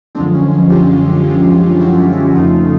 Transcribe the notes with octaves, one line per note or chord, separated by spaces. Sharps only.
F#2 D3 F3 G#3 C4 D4
C#4
C#4
F#2 D3 F3 G#3 F4 G4
F#2 D3 F3 G#3
F#2 D3 F3 G#3 E4 F#4
F4 G4
F2 C#3 F3 A3 D#4 F4